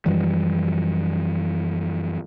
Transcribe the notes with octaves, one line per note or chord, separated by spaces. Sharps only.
F#2 E3 F3 G3